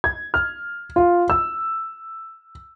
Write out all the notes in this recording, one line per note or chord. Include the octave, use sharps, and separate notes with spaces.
G#6
F6
F4
E6